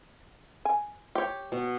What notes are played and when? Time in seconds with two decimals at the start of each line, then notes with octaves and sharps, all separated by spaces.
0.65 G#5
1.15 G4 C#5
1.52 B2